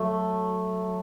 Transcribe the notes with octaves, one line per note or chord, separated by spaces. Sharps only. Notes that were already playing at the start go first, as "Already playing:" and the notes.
Already playing: F#3 A3